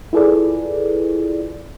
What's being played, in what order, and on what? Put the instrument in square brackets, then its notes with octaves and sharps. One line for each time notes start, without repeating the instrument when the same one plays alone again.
[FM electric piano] E4 F4 G#4 A4 B4 D5